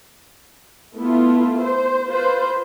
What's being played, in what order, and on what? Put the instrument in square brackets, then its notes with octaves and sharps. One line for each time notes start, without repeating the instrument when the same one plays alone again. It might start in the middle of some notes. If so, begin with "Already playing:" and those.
[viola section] A3 B3 E4 F4
C5
F4 B4 C5